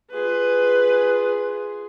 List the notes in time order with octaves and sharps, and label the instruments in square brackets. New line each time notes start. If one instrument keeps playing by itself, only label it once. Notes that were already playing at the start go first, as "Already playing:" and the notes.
[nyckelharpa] F4 G#4 [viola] B4